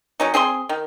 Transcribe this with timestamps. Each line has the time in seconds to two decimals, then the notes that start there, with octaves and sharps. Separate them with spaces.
0.20 F#3 C#4 D#4
0.34 C4 G#4 C5 C6
0.69 D#3